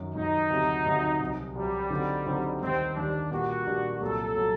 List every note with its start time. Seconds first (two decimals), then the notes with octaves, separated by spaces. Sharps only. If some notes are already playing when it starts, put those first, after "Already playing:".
Already playing: F#2 D#3 F#3
0.15 F#2 D#3 F#3 D#4
0.50 D2 C3 F#3
0.86 D2 C3 F#3
1.20 C2 C3 F#3
1.55 C2 C3 F#3 G3
1.91 D3 F#3 C4 D#4 G4
2.26 D3 F#3 C4 D#4 G4
2.61 D#2 D#3 G3 C4
2.95 D#2 D#3 G3 D4
3.31 A#2 G3 A#3 D4 F#4 G4
3.66 A#2 G3 A#3 D4 G4
4.01 C2 A#2 F#3 A3 A4
4.36 A#2 F#3 A3